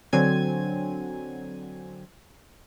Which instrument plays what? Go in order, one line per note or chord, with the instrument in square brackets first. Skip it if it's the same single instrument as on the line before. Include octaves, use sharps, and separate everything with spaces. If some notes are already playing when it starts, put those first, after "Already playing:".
[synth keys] D3 F#3 C4 G#5 G#6